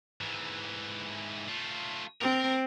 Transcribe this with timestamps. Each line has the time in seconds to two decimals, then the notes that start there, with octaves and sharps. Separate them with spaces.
0.21 G#2 E3
1.48 A3 F4
2.22 C4 A#4